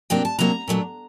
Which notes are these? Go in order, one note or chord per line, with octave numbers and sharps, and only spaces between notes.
C3 F#3 A#3 D4 G5
A5
C3 F#3 A#3 D4 A#5
A#2 F#3 A3 D4